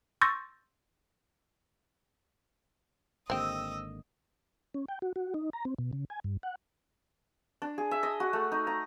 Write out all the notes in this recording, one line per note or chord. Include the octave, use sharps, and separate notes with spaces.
C6 C#6 E6 G6 A6 A#6
G#1 D3 A#3 C4 G4 D#5 E6
C#4
G5
F#4
F#4
D#4
A#5
C4
B2
C#3
G#5
G2
F#5
D4
G#4
E5
D#5
F#4
A3
D#4
A#5